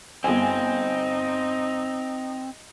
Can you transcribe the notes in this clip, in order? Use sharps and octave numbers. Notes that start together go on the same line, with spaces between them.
G1 C4 D#4 G#5